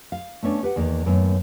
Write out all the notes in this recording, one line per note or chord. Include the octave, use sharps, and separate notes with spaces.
F5
A3 B3 C#4 D4
G4 B4 F#5
E2 D#3 A#3
F#2 A2 D#3 A#3 B3